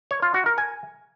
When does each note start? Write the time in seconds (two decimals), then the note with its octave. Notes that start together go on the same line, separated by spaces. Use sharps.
0.11 C#5
0.22 F4
0.34 F#4
0.46 A#4
0.58 G#5